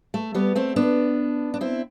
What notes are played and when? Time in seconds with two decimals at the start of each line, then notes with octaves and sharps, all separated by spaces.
0.14 A3
0.34 G3 B3
0.55 A3 C4
0.76 B3 D4
1.54 D4
1.61 C4 E4